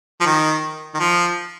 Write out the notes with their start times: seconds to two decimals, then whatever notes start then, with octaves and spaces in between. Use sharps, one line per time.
0.21 F3
0.26 D#3
0.95 D#3
1.00 F3